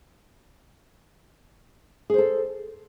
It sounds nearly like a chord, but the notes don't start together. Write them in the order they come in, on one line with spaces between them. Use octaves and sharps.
G#4 C5 A4